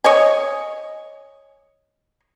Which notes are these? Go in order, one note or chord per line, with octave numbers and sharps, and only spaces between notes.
C#5 D#5 G#5